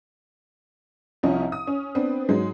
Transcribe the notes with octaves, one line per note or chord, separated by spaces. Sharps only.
C2 F3 C#4 D#5
D#6
C#4
B3 C4 D4 B4
G#2 F#3 G#3